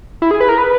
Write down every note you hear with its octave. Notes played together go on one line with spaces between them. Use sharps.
E4
G#4
B4
A#4
B4